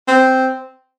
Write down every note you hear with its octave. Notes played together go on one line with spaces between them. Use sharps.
C4